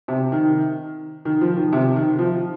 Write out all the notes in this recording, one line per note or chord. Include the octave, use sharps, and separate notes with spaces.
C3
D#3
D#3
F3
D#3
C3
D#3
F3